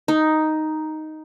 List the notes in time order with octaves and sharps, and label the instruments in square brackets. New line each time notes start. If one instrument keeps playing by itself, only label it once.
[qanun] D#4